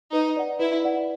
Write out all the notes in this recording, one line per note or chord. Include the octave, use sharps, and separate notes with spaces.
D#4 B4
D5 F#5
E4 B4
D5 F#5